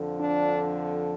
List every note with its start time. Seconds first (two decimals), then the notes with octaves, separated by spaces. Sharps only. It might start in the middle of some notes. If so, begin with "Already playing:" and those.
Already playing: F2 D3 F3
0.18 D4